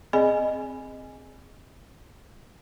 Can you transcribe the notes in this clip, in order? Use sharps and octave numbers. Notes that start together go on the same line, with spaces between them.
C4 G#4 D5 D#5 G#5 B5